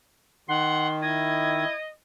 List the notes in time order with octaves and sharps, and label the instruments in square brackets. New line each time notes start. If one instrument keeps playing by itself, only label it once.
[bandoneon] D#3 [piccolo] F#5 [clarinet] C6
[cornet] E4 [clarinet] D#5 [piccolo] G#6